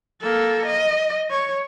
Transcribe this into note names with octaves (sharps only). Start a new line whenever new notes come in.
A#3 A4
D#5
C#5